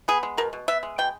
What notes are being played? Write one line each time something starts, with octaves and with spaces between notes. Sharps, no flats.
B3 G#4
G#3
B2 A#4
B2
B3 E5
G#3
B2 G5